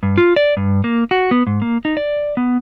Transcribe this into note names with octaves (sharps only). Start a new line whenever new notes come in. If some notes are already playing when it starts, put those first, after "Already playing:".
G2
F4
D5
G2
A#3
F#4
B3
G#2
A#3
D#4
D5
B3